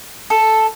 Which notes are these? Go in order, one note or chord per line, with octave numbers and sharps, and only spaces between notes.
A4